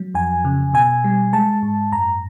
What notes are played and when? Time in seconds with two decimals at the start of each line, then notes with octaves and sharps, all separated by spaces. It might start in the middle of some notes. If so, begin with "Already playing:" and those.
Already playing: F#3
0.14 F2 G#5
0.45 C#3
0.73 B2 G#5
1.04 G3
1.33 G#3 A5
1.62 G#2
1.92 F#2 A#5